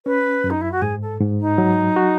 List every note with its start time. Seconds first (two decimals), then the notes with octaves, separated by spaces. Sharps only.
0.05 C#4 B4
0.44 F#2
0.50 D#4
0.61 E4
0.71 F#4
0.81 G#2 G#4
1.01 A4
1.20 G#2
1.40 D#4
1.58 F#3
1.96 F#4